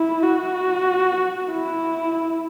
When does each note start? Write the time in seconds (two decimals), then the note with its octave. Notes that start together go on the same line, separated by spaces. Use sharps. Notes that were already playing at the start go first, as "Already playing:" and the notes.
Already playing: E4
0.23 F#4
1.51 E4